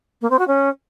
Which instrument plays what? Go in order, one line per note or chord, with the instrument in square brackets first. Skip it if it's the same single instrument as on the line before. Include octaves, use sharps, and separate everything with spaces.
[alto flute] A#3
C4
F#4
C#4